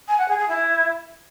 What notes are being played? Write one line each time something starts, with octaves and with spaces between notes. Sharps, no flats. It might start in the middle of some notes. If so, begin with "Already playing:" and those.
G#5
F#5
G#4
G#4
E4